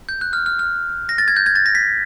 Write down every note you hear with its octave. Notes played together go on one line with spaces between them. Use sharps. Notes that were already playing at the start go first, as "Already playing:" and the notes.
G6
F#6
F6
F6
F6
A#6
A6
G#6
G6
G#6
A6
A#6
B6